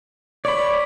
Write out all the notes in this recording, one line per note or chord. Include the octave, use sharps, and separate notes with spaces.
C#5 D5 B5